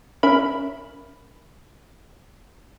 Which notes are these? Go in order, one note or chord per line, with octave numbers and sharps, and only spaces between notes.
C#4 A#4 E5 B5